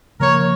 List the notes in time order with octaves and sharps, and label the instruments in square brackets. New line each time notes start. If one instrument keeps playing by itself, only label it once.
[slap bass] C#3 F3 A#3 [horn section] A#4 C#5